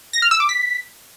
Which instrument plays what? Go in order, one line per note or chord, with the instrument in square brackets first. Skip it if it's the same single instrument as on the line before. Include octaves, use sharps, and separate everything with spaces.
[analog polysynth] A#6
F6
E6
D6
B6